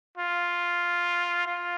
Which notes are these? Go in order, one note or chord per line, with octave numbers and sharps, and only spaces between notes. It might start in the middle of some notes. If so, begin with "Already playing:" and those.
F4
F4